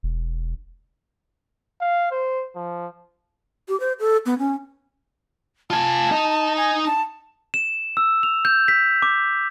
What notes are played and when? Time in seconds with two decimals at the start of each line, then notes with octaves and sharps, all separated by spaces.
0.03 E1
1.81 F5
2.11 C5
2.56 F3
3.68 G4
3.80 C5
4.00 A4
4.26 B3
4.39 C#4
5.70 F4 G#5 A5
6.11 D#4 D#5
6.57 G#5
6.86 A5
7.54 E7
7.97 E6
8.23 F7
8.45 G6
8.68 B6
9.02 D6